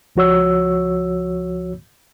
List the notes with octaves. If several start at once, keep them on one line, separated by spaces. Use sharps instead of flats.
C#2 F3 F#4 C#5 E6